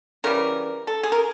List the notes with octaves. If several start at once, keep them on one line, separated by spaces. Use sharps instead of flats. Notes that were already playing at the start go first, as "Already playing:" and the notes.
C#3 E3 G3 A#4
A4
G#4
A#4